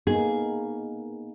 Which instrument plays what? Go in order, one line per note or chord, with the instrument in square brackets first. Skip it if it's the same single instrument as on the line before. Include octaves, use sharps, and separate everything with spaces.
[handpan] A#3 B3 D#4 [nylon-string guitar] G#4